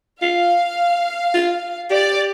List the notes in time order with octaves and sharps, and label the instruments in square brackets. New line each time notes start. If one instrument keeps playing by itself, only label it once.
[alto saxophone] F4 [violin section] F5
[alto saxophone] F4
[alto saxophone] G4 [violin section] D5